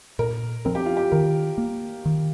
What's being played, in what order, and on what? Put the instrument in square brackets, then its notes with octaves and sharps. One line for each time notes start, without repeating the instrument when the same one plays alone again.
[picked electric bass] A#2 [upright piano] A#4
[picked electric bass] F3 C4 [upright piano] A#4
[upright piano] G4
F4
G4
[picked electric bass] D#3 [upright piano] A#4
[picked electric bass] A#3
D#3